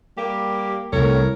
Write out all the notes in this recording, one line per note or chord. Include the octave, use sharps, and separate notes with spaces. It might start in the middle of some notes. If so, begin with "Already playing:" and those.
G3 A#3 G4
C2 A2 A#4 C#5